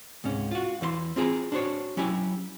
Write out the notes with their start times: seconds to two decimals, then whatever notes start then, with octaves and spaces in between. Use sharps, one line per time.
0.24 C#2 G#2 C3 C#4
0.51 F4 F#4
0.81 E2 E3 B4 C6
1.16 C4 F4 G#4 G#5 A#5
1.52 D4 F#4 C5 C#5
1.97 F#3 C#4 E4 G4 G#5